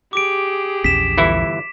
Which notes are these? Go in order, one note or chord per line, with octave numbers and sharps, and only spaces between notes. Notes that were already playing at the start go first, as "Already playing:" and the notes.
G4 G#4 D6 D7
A#1 E2 C#4 B6 E7
G1 E3 E4